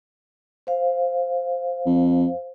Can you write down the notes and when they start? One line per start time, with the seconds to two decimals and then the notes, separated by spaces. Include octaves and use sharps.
0.67 C5 F5
1.86 F2